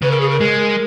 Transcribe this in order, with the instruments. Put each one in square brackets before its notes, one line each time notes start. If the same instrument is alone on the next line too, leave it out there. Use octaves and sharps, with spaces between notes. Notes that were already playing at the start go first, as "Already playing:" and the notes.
[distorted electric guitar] C#3 [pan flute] B4
[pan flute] A#4
G#4
A#4
[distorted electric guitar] G#3